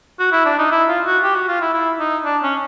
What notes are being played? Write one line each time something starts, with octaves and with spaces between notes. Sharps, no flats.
F#4
E4
D4
D#4
E4
F4
F#4
G4
F#4
F4
E4
E4
D#4
D4
C#4